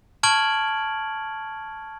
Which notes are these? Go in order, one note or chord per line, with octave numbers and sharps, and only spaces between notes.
A5 C#6 F6 G#6 D7 F#7